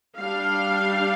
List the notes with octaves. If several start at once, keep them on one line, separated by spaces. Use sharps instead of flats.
G3 D4 F5